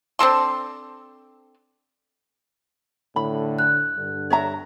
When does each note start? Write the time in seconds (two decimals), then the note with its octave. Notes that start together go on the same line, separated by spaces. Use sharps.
0.19 C4 D4 A4 C6
3.16 A2 D3 B5
3.59 F#6
3.97 G2 D3
4.30 C#5 E5 A#5